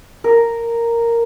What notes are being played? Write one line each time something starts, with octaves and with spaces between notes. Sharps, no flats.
A#4